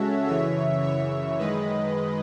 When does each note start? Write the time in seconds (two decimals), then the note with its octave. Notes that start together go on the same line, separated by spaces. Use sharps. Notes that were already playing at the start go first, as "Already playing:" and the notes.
Already playing: C#3 G#3 C#4 F#4 A4 C#5 E5
0.27 F#2 C#3 E3 C#5 E5
0.83 C#5 E5
1.39 F#2 D#3 G#3 B4 D#5